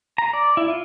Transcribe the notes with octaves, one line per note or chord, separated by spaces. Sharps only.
A#5
D5
E4
F4